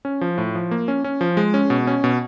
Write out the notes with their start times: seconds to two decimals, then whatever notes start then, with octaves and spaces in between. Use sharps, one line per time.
0.05 C#4
0.21 F3
0.38 A2
0.55 F3
0.71 A#3
0.88 C#4
1.04 C#4
1.21 F3
1.37 G#3
1.54 C#4
1.70 B2
1.87 C#4
2.04 B2